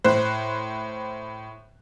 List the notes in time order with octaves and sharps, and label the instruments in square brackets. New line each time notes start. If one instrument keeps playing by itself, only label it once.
[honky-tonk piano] A2 C5 F#6